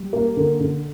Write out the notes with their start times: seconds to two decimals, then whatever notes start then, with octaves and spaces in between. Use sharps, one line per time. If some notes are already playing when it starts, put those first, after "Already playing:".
Already playing: G3
0.13 A#3
0.37 D3
0.60 D3